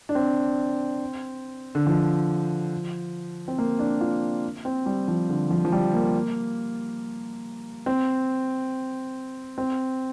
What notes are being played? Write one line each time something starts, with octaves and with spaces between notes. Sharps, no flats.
D4
C4
D3
F3
C4
A#3
D4
F4
C4
G3
F3
D3
F3
F3
G3
A#3
C4
C4